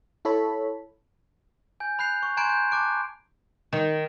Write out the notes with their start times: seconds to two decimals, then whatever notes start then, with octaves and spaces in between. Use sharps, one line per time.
0.25 E4 A4 C#5 B5
1.80 G#5 G6
1.99 B5 F#6 G6 C7 F7
2.23 C#6
2.37 G#5 A#5 C6 F#6 G#6 D7
2.49 G6 D7
2.71 A5 D6 F#6 D7
3.73 D#3